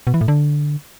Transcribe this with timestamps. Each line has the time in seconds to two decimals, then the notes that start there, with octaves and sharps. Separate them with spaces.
0.07 B2
0.14 E3
0.21 A2
0.28 D3